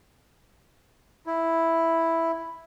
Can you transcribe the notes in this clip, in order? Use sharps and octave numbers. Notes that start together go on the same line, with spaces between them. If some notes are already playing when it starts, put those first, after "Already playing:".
E4